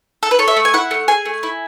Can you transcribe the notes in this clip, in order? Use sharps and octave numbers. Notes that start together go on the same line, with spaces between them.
A4
B4
A4 C#5
E5
A3
G#5
E4 F#5
A3
G#4 G#5
A3
E4